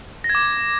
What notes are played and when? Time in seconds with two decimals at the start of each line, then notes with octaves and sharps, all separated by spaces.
0.24 A#6
0.29 G#6
0.35 D6